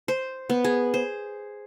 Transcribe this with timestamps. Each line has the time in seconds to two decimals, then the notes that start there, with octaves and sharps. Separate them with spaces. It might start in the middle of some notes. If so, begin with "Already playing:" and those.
0.08 C5
0.50 B3
0.64 G#4
0.94 C5